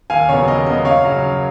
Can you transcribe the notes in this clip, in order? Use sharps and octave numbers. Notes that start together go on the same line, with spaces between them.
D#2 F5 G#5
C#3 F#3 B3 C#5
D#2 D#5
C#3 F#3 B3 D#5
F#2 C#5 F5
C#3 F#3
F#2